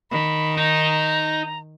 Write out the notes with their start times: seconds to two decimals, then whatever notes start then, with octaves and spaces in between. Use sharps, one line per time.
0.11 D#3 B5
0.57 D#4 A#5